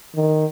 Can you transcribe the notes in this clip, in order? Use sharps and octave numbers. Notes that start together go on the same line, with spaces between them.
D#3